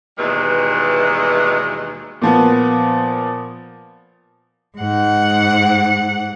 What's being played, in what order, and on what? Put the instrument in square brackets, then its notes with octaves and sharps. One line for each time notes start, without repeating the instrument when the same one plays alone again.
[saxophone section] D#2 B2 E3 G3 G#3
[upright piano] A#2 F3 B3
[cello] G#2 F#5